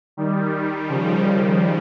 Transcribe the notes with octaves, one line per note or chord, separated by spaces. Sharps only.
D#3 G3
C#3 F3